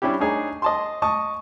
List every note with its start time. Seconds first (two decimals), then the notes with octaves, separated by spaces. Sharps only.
0.02 G3 C#4 D4 E4 G4
0.20 D4 D#4 G#4 C#5
0.62 D#5 A5 C6
1.02 D#5 A5 C#6 D#6